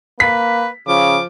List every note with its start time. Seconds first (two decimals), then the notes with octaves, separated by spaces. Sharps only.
0.20 A#3 B4 B6
0.88 C#3 F3 D6